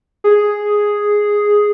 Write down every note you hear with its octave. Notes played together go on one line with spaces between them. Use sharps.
G#4